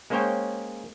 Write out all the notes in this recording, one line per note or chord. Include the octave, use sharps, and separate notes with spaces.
G#3 A#3 C#4 C5 C#5 G5